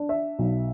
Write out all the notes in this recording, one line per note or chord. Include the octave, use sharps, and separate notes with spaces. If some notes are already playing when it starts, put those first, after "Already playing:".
Already playing: D4
E5
B1